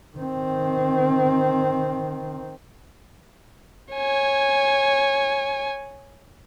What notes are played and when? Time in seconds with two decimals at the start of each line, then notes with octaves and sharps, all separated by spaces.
0.17 D#3 C4
3.94 C#5 G#5